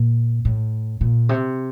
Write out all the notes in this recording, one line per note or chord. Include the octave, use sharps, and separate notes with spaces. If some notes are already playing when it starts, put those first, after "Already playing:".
Already playing: A#2
A2
A#2
C3